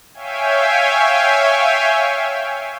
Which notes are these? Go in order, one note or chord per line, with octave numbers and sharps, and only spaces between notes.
C#5 E5 F5 G5 G#5